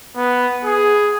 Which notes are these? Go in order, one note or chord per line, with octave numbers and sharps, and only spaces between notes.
B3
G#4